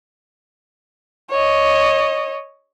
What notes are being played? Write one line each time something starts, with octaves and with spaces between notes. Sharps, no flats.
C#5 D#5